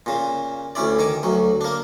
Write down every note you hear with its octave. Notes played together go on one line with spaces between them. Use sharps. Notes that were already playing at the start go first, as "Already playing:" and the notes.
A#2 C#3
D2 C#4 E4 D5
D#3 G#5 D6
D2 F#3
A#3 D4